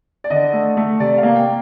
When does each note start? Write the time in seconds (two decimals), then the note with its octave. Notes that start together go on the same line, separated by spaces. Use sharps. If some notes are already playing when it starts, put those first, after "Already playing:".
0.24 D5
0.30 D3 D#5
0.53 A3
0.77 A3
1.00 C3 D5
1.18 F5
1.23 A#3
1.36 G5